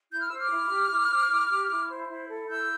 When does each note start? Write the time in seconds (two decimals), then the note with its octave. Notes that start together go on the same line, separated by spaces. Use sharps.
0.11 E4 G6
0.20 F6
0.29 C5 E6
0.38 D6 F6
0.49 E4
0.69 G4
0.89 E4
1.08 C5
1.29 E4
1.48 G4
1.69 E4
1.89 C5
2.08 E4
2.27 A4
2.47 E4 E6 G6